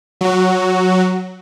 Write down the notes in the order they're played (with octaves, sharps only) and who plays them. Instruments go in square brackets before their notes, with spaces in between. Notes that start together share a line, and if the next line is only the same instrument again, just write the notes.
[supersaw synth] F#3 F#4